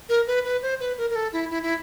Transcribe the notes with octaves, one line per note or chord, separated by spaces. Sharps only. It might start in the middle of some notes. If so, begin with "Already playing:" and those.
A#4
B4
B4
C5
B4
A#4
A#4
A4
E4
E4
E4